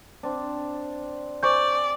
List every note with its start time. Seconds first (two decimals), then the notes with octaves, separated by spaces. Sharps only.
0.23 C4 D4
1.43 G#4 C5 D5 G#5 C#6 G6